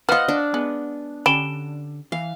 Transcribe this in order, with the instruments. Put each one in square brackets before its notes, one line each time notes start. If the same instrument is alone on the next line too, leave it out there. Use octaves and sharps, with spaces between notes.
[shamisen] B3 F4 [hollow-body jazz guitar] C5 F5 [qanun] D#5 F#5 [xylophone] F6
[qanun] D4
[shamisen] G#3 [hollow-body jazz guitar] B3
[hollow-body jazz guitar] D3 [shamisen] C#4 G4 B5 [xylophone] D7 E7 G7
[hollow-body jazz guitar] E3 [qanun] F5